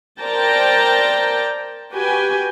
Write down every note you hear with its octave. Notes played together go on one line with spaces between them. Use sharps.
A#4 C5 D5 G5 A5 A#5
F#4 G4 B4 G5 G#5